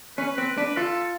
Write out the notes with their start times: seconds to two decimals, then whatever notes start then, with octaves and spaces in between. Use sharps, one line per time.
0.18 C#4 B4
0.37 C4 B4
0.57 D4 B4
0.77 F4 A4